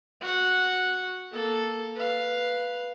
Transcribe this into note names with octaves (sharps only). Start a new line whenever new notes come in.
F#4 F#5
A#3 A4
B4 F5